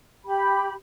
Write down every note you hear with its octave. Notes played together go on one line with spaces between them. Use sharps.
G4 B5